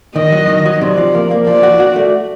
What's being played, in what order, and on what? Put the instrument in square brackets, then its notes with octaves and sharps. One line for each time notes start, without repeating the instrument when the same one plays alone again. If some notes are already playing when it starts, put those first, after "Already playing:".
[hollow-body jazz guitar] D#3 [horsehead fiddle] D#5
[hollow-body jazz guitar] F#3
D#3
F#3
[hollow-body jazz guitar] C3 [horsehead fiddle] D5
[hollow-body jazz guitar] F3
A#3
A#3
[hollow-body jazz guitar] F3 [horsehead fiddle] D5
[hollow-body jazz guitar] F#4
F#4
A3